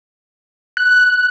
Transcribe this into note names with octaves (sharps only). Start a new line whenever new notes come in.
F#6